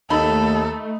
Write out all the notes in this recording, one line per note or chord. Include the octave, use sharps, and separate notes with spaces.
D#2 A3 D#4 A4 B5